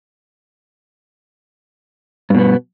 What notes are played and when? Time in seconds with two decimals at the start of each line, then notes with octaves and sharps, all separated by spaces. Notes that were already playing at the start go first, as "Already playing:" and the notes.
2.30 G2
2.35 B2
2.39 B3